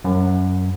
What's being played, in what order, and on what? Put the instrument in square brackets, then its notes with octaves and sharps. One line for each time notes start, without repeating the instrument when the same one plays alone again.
[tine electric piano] F#2